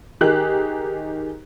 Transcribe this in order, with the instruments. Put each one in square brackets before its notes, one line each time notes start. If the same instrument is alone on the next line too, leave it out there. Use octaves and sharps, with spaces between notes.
[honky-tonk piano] D#3 D#4 G4 G#4 A#4 F#6